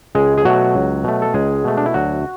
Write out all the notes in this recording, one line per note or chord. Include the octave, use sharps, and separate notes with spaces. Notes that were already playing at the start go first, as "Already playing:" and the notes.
C#2 G#3 G#4
G#4
B2 F#3 A3 F#4
C#2
B2 A3
A4
C#2 G#3 G#4
B2 A3
D4
E4
D2 F#3 F#4